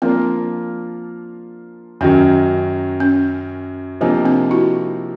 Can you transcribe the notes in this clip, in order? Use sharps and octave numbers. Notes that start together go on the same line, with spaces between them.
F3 A#3 C4 D4 F4 A#4
F#2 D#3 F#3 C#4
C#4
C3 F3 A#3 C4 D4 D#4
C4 D4
E4 F#4